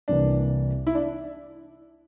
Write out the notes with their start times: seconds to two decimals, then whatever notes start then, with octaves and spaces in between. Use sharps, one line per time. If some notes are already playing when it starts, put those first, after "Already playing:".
0.08 C2 C3 E3 A#3 D4
0.87 E4
0.95 D4